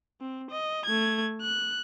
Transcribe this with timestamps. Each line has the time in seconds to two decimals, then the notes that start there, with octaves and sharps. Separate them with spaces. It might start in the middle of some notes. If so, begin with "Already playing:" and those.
0.21 C4
0.51 D#5
0.85 A3 G#6
1.41 F#6